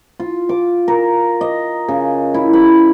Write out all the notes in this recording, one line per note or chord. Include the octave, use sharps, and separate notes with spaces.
F4
D6
A#4
D#5
C#3
E4
B5